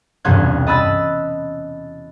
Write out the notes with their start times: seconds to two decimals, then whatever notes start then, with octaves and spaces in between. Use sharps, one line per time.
0.25 E1 C2 G2 C#4 F#6 G#6
0.67 D#5 A5 B5 E6 F#6 A6